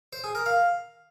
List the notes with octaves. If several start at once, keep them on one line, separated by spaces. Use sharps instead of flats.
C5
G#4
A#4
F5